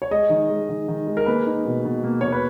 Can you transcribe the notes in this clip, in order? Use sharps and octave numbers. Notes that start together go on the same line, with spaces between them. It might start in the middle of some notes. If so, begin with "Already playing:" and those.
C#5
G#3 D#5
D#3
G#3
D#3
D#3
G#3
A#4
A#3 B4
D#4
B2
B2
A#3
B2 C#5
B4